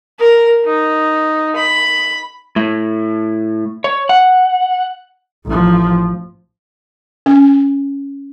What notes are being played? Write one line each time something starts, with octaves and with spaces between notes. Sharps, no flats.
A#4
D#4
B5
A2
C#5
F#5
A1 F3
C#4